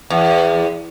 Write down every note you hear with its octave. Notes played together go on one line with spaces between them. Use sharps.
E2